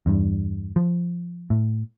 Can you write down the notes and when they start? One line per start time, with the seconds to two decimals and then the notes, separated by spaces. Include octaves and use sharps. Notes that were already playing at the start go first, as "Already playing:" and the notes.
0.06 E2 G2
0.76 F3
1.50 A2